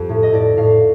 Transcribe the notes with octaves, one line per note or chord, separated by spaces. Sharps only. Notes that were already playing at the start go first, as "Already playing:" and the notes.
Already playing: F2 G4
A2
D#5
A2 D5
A2 F5